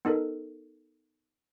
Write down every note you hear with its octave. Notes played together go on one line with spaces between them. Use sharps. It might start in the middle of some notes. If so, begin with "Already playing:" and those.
B3 D#4 A4 A#4